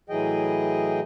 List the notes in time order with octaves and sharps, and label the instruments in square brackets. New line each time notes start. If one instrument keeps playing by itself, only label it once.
[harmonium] A2 E3 F#3 G#4 D#5 G5